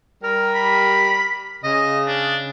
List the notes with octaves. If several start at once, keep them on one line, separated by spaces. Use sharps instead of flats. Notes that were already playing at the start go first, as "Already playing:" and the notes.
G3 G4 A#4
B5
C#3 D#5
D4